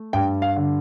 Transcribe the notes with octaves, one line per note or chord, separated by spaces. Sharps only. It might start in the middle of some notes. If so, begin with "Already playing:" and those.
Already playing: A3
G2 G5
F5
D3